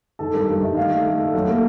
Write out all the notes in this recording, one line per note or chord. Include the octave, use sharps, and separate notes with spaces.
D#3 A4
G2 A#4
G2
D#3 E5
A3 F5
A3
A3
A3
F#3
A#3